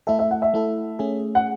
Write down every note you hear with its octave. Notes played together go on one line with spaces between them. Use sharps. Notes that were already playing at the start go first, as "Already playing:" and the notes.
A3 E4 A4 E5
E5
F#5
E5
A3 E4 A4
A3 C#4 G#4
F#5